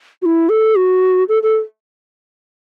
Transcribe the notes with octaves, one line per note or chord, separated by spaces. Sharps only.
F#4
E4
A4
F#4
A4
A4